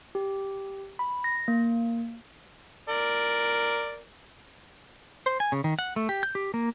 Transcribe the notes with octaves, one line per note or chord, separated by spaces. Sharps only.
G4
B5
A#6
A#3
A#4 D5
C5
G#5
C#3
D#3
F#5
A3
G4
G6
G4
A#3